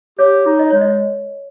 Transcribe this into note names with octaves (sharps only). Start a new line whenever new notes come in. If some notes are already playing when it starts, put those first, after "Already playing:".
G4 C#5
D#4
D#5
G#3 C#5
D#5